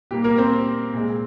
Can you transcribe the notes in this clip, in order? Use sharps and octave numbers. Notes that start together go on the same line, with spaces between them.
A#2 G3 A#3 G4
A#3 A#4
C4 C5
A#2 G#3